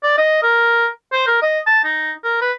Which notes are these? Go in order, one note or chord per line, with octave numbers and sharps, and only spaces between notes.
D5
D#5
A#4
C5
A#4
D#5
A5
D#4
A#4
B4